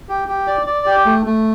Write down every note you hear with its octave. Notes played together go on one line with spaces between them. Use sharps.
G4
G4
D5
D5
G4
A3
A3